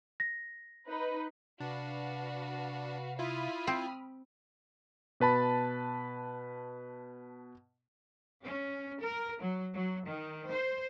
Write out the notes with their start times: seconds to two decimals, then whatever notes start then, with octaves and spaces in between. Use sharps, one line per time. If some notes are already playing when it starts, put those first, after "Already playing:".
0.20 A#6
0.88 D#4 B4
1.60 C3 D4 F#4 B4 F5
3.19 E4 F4 B5 D#6 F6
3.67 C4
5.20 B2 B4 A5 B5
8.43 C#4
9.01 A#4
9.41 F#3
9.74 F#3
10.07 D#3
10.49 C5